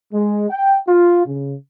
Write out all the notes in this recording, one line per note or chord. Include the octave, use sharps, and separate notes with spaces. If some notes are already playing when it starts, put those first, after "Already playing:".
G#3
G5
F4
C#3